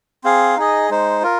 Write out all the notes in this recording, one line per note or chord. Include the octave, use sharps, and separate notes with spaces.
C4 G#4 F5
D#4 G#4 D#5
G#3 D#4 C5
F4 A#4